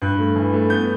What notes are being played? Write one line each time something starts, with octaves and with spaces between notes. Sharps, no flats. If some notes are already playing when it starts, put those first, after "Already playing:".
G2 F#6
A3
E3
A3
B3 G6